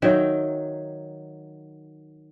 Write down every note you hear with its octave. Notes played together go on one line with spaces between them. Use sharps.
D#3 F#3 E5 G5